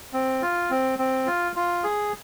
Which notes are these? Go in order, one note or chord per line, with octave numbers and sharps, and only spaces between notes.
C4
F4
C4
C4
F4
F4
G#4